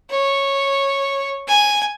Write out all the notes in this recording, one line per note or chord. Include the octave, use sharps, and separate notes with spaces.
C#5
G#5